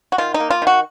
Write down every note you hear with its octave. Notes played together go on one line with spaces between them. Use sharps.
F#4
D#3 F4
D#4
A#3
F4
D#3 F#4